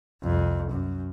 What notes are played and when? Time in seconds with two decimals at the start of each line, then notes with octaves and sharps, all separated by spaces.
0.23 C2 F2
0.71 F#2